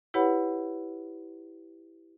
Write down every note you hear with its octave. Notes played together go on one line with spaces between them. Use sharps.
E4 G4 B4 C#5 F#5 B5